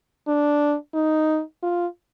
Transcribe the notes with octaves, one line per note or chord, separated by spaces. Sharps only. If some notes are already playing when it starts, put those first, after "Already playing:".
D4
D#4
F4